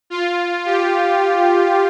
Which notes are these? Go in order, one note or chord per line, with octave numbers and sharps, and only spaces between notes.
F4
G4